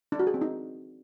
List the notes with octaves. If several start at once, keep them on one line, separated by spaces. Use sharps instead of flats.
D4
F#4
G#4
C4
D#4